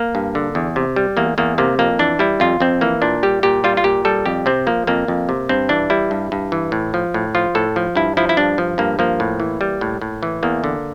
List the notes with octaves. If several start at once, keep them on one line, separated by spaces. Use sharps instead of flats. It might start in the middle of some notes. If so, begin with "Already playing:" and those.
Already playing: A#3
G2
D3
E2
C3
G3
E2 A#3
E2 A#3
C3 A#3
F2 A#3
E3 D4
G3 E4
F2 F4
F2 C4
E3 A#3
A#2 D4
G3 G4
A#2 G4
G3 F4
F4
A#2 G4
G3 A4
F2 G4
C3 C4
F3 A#3
F2 A#3
F2
C3
G2 C4
E3 D4
G3 E4
G2
G2
E3
A2
F3
A2
F3 F4
A2 A4
F3
G2 E4
F3 E4
E4
G2 D4
F3
G2 A#3
F3 A#3
A2
E3
G3
A2
A2
E3
E2 A#3
D3